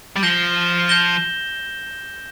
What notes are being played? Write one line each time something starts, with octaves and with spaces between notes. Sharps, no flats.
G3
F3 G6 A#6 E7 G7
G6 A#6 E7 G7